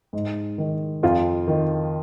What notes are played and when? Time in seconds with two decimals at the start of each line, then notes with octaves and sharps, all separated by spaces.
0.13 G#2
0.58 D#3
1.03 F2 F4
1.47 D#3